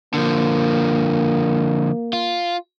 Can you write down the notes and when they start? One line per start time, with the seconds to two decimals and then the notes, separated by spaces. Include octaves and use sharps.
0.14 D3 F3 A#3
2.13 F4